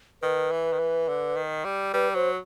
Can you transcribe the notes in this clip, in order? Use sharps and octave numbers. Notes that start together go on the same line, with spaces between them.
D#3 B4
E3
D#3
E3
D3
D#3
G3
G3 B4
F#3 C5